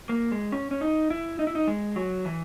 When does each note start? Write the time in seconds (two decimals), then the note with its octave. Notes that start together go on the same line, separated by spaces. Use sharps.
0.09 A#3
0.32 G#3
0.52 C#4
0.71 C#4
0.81 D#4
1.10 E4
1.39 D#4
1.47 E4
1.55 D#4
1.67 G#3
1.96 F#3
2.25 E3